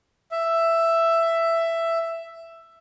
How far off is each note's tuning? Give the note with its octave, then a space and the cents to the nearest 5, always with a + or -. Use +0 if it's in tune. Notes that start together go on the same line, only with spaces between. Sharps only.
E5 +10